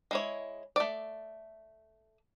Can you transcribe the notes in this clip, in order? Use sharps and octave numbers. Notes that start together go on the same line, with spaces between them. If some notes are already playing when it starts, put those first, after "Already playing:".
G#3 E4 C#5
A3 D5